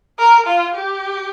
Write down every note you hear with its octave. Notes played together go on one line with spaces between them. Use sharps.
A#4
F4
G4